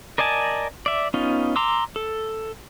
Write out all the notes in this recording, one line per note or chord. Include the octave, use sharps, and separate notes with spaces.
A#4 D5 D#5 G#5 A5
D5 E5
B3 C#4 D#4 F4
A#5 C6 D6 E6
A4